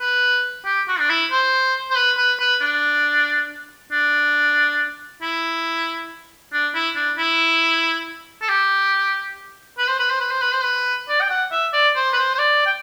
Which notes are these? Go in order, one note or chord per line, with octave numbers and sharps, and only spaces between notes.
B4
G4
F#4
D4
E4
C5
C5
B4
B4
B4
D4
D4
E4
D4
E4
D4
E4
A4
G4
B4
C5
B4
C5
B4
C5
B4
C5
B4
D5
G5
F#5
E5
D5
C5
B4
C5
C5
D5
G5